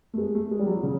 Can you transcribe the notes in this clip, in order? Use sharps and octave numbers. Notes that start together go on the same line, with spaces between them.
A3
G#3
A3
G#3
G3
F#3
F3
C#3